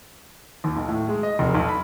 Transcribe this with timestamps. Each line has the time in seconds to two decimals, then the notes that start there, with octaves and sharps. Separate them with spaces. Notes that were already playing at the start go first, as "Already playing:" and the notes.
0.64 D#2
0.76 B1
0.89 A2
1.09 G#3
1.23 D#5
1.39 F1
1.55 B1
1.69 B5